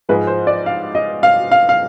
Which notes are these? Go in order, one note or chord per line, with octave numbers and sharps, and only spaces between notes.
G#2 F3 G#3 B4
C5
D5
F5
D#5
F5
F5
F5